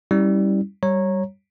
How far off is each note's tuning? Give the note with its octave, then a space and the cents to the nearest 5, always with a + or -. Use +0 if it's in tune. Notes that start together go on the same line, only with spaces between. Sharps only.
G3 +0 C#4 -20 E4 -30
G3 -10 C#5 -15 A#5 +0